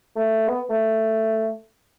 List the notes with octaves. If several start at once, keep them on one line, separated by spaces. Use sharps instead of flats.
A3
B3
A3